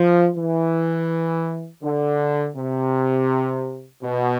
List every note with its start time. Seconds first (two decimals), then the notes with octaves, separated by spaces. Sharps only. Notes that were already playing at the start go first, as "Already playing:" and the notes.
Already playing: F3
0.36 E3
1.83 D3
2.56 C3
4.03 B2